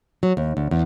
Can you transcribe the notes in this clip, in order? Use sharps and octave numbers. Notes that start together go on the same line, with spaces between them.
F#3
D#2
D2
E2